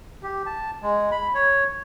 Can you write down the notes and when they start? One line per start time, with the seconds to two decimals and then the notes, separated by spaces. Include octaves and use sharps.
0.23 G4
0.46 A5
0.82 G#3
1.12 B5
1.35 C#5